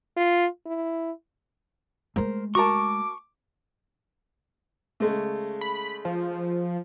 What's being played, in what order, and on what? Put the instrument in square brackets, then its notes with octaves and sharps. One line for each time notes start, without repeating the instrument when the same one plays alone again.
[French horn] F4
E4
[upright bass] G#3 A3 [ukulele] A#4 C5
[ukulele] F#4 A#4 A5 [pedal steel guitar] C#6 [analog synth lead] D6
[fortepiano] C#3 G#3 A3
[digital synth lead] B5
F3